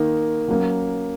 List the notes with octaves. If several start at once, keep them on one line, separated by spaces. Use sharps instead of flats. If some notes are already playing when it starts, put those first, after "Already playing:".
Already playing: D#3 A#3 D#4
F#3 A#3 C#4